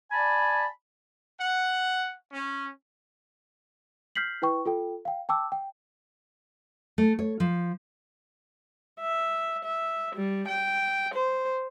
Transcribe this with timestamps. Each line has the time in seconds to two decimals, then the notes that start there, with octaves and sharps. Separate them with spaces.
0.11 D5 G#5 A5 B5
1.41 F#5
2.33 C#4
4.15 F6 G6 B6 C7 F#7
4.42 E4 B4 G5 C#6
4.65 F4 A4 G5
5.05 F5 G5
5.29 G5 A5 D6 E6
5.52 G5
6.98 A3
7.19 C#5
7.40 F3
9.01 E5
9.64 E5
10.15 G3
10.48 G5
11.14 C5